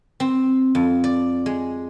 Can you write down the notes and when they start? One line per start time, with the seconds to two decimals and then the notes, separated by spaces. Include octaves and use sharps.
0.20 C4
0.75 F2
1.04 D5
1.46 G#3